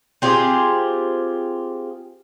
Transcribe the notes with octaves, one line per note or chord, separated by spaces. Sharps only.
C4 F4 G4 G#4